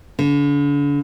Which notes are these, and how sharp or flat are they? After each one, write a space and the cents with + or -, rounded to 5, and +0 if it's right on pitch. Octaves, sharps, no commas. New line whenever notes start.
D3 -40